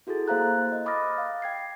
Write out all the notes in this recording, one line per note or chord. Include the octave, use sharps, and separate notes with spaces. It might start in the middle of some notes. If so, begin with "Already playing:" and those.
E4 F#4 G#4 A4 A6
A#3 C5 F5 A#5 F#6
D#5
B5 D6 D#6 F6 A6 A#6
F5
G5 G#6 C7